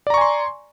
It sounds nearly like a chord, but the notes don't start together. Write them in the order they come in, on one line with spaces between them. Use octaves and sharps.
D5 A#5 C#6 G#5 C6